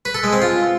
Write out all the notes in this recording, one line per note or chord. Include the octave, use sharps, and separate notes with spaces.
B4
A4
G#3
C4
F4